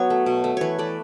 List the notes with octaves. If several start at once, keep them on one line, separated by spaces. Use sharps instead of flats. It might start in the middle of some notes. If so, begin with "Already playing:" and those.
Already playing: F#3 B3 B4 C#5
A3
B2
A3
E3 B4 C#5
A3 D5